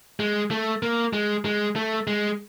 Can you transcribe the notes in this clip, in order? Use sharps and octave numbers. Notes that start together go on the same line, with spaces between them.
G#3
A3
A#3
G#3
G#3
A3
G#3